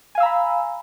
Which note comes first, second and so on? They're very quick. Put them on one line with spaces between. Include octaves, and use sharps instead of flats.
G#5 F5 E6 A#5 B5